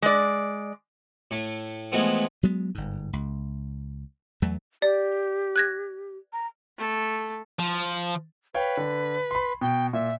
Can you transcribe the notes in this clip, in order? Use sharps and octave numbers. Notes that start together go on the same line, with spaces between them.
G#3 D5
A2 A3
E3 F3 G#3 A3 B3 C4
F#3 G#3 B3
G1 G#2
C#2
E2 F#3 A3
G4 D5
F#6 G#6 A#6
A#5
A3 A4
F3
B4 C#5 F5 G5
D3
B5 C6
B2 G5
A#2 E5